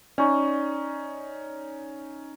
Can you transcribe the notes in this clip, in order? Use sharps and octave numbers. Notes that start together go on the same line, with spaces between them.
C#4 D#4 D5 G#5 C#6